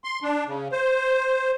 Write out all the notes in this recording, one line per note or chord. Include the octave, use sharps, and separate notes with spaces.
C6
D4
C#3
C5